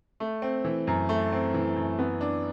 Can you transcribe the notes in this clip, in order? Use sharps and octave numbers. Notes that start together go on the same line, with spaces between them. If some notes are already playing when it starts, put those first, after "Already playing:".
A3
C4
E3
F#2
A3
C4
E3
F#2
B3
D4